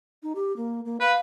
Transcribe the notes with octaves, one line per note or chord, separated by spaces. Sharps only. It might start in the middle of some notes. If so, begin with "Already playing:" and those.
D#4
G4
A#3
A#3
B4 F5